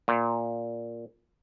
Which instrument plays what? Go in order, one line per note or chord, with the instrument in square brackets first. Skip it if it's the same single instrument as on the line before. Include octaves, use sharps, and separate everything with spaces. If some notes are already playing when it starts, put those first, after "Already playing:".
[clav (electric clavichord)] A#2